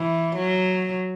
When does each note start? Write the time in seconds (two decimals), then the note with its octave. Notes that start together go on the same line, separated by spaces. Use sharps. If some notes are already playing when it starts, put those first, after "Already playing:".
Already playing: E3
0.36 F#3